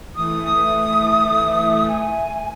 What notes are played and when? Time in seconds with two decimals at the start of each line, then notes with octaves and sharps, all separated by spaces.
0.16 E3 A3 D#6
0.64 E5
1.88 G#5